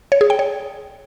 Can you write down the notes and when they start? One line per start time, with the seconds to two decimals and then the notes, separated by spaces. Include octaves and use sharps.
0.12 C#5
0.21 G#4
0.30 G5
0.39 C#5